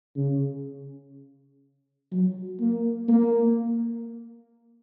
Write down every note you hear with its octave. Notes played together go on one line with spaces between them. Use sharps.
C#3
F#3
A#3
A#3